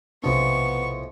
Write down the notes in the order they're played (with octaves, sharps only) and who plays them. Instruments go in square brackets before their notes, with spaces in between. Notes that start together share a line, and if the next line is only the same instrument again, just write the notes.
[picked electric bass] B1 C3 D4 [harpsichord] A2 F3 G#3 [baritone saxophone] B3 [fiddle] C#6